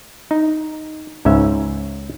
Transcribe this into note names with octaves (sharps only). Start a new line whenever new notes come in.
D#4
C#2 G#2 C#4 E5